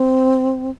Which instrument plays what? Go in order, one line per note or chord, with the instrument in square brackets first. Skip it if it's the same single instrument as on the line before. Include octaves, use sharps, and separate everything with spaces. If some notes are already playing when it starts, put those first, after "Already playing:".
Already playing: [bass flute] C4